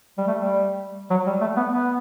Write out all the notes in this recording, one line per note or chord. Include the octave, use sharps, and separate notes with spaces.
G3
A3
G3
F#3
G3
A3
B3
B3